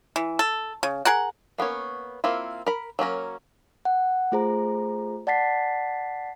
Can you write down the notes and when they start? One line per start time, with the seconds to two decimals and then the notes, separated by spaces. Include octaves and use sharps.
0.16 E3
0.39 A4
0.83 C#3
1.05 G#4 A#4 F#5
1.58 A#3 B3 C#4 C#5
2.24 A#3 C4 E4 F4
2.66 A#4 B5
2.99 F#3 A#3 C#4 A#4
3.85 F#5
4.32 A3 F4 G#4 C5 A#5
5.27 D5 F#5 A5 A6 B6 C7